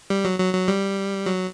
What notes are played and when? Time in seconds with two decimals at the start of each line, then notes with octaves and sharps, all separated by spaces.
0.10 G3
0.25 F#3
0.39 F#3
0.54 F#3
0.68 G3
1.26 F#3